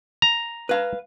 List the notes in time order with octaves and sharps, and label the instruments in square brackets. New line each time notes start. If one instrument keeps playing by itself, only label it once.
[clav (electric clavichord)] A#5
[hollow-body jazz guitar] B4 F5